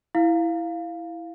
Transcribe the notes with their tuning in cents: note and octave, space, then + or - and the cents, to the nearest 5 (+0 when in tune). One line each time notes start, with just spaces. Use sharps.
E4 +0 F5 +0